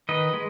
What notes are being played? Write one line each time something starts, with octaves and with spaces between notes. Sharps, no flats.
D#3 B4 D#5
G#3